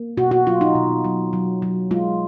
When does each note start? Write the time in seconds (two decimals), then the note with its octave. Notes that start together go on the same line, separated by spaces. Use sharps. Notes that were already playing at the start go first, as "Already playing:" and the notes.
Already playing: A#3
0.17 B2 F#4
0.31 F#4
0.46 F#3 F4
0.61 D#4
0.75 B2
1.04 F#3
1.33 F#3
1.62 F#3
1.91 G#3 F4